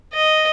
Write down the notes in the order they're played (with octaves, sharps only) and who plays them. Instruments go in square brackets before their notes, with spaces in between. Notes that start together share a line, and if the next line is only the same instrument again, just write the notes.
[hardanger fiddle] D#5